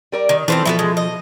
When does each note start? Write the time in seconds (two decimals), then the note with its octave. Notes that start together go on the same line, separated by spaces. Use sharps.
0.12 G3 A#4 D5
0.29 D#3
0.48 E3 C4 E4 F4 A4 B4 C5
0.65 B2 F3 B3 C4 E4 A4
0.79 G#3
0.97 D#5